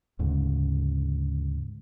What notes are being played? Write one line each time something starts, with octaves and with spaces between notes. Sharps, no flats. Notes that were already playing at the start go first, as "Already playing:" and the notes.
D2 G#2 C#3